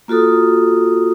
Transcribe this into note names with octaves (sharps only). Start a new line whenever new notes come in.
A#3 F4 F#4 A4 D#6